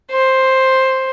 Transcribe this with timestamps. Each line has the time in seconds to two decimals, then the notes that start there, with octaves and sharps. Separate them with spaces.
0.12 C5